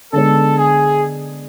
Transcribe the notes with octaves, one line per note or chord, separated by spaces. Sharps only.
D3 G#3 B3 D4 A4
G#4